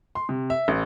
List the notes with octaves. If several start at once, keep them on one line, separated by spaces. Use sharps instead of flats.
C6
C3
E5
A1